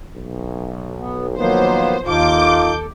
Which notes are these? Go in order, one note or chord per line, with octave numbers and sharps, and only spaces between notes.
B1
B3
D#3 F3 F#3 A#3 B3 C5
D#2 D#4 F4 A4 D6 G6